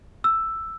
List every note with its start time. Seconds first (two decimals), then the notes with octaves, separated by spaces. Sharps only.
0.24 E6